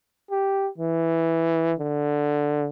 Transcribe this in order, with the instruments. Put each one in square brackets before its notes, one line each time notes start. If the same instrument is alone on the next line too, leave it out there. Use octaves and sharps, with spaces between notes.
[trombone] G4
E3
D3